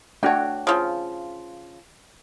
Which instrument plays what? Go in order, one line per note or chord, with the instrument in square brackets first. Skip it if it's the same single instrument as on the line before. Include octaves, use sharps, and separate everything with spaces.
[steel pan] A3 D4 F#4 [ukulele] C#5 G5
[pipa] C#3 F3